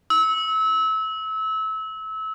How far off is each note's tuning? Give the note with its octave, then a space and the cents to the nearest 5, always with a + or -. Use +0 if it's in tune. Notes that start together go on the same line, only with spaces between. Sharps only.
E6 -25